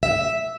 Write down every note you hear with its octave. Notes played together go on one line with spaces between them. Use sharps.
E5